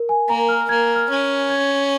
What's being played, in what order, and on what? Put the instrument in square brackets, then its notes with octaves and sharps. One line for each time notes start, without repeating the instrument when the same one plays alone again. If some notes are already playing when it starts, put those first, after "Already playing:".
Already playing: [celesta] A#4
G#5
[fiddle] A#3 [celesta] A#5
[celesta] F6
[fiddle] A#3 [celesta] G#6
[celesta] F6
[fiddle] C#4
[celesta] G#6